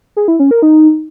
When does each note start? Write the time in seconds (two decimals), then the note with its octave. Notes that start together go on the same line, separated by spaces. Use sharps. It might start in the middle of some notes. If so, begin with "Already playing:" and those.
0.16 G#4
0.28 E4
0.39 C#4
0.51 A#4
0.62 D#4